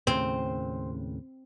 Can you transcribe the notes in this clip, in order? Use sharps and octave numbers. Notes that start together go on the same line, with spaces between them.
D#2 A2 C#3 C4